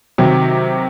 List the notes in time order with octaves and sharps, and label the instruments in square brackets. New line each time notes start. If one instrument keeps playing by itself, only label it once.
[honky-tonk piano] C3 D#3 F#3